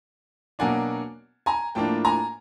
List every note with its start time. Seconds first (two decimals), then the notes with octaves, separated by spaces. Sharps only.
0.59 B2 F#3 A#3 D4 F#5 G#5
1.46 G#5 A#5
1.75 A2 F3 A#3 D4 G5 A5
2.05 G#5 A#5